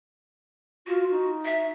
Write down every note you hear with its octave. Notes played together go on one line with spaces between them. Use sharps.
F4 F#4
D#4
E5